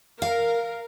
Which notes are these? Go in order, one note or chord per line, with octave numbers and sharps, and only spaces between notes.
A#4 F5